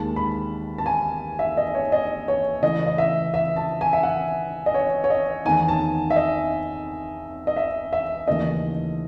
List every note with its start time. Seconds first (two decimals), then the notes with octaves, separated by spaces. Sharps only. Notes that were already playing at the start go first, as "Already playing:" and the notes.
Already playing: D#2 D#3 G#3 A5
0.16 B5
0.78 A5
0.86 G#5
1.39 E5
1.57 D#5
1.75 C#5
1.92 D#5
2.28 C#5
2.62 C#3 E3 A3 E4 D#5
2.87 D#5
2.98 E5
3.34 E5
3.56 A5
3.81 G#5
3.93 E5
4.03 F#5
4.66 D#5
4.74 C#5
5.04 C#5
5.10 D#5
5.45 E2 D#3 A3 D#4 G#5
5.68 A5
6.10 E5
6.16 D#5
7.47 D#5
7.56 E5
7.93 E5
8.27 D#2 C#3 E3 A3 C#4 D#5